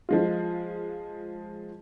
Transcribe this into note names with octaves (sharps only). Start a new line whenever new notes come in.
F3 G#3 F4